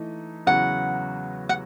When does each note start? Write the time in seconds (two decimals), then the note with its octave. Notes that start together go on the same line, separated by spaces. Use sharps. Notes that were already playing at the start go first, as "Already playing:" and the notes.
Already playing: E3 A3 D#4
0.47 E2 C#3 F#3 B3 F#4 F#5
1.49 F#5